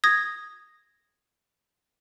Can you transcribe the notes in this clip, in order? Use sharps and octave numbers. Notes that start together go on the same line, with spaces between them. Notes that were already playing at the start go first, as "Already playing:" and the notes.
D#6 G#6 A#6